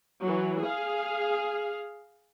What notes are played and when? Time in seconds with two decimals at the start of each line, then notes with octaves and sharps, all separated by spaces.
0.24 E3 F#3
0.62 G#4 F5